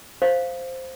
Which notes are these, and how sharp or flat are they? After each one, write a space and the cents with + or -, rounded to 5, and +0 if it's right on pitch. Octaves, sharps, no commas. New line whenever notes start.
C5 +0 F5 +0